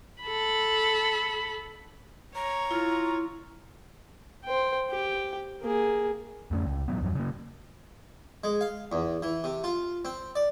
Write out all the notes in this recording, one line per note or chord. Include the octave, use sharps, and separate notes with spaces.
A4 B5
C#5 A#5
E4 F4
C5 G5
G4 G5
A#3 G#4
F2 A3 C#4
C#2
A1 C3 F#3 B3
E2 G2 F3 F#3
C#3 A#3
G#3
F5
E2
E3
C3
F4
C4
D5